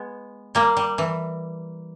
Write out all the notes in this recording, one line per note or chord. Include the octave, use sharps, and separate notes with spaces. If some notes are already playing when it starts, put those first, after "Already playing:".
Already playing: G#3 B3
G3 A#3
G3
E3